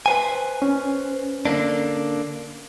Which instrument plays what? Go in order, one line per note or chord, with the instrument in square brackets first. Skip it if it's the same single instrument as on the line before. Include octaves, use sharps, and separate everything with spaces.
[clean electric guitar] B4 C5 G#5
[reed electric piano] C#4
[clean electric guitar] D3 A#3 D4